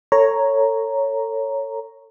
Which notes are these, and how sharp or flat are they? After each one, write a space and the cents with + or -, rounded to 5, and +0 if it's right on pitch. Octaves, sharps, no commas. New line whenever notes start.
A4 +30 C#5 +0 A#5 +0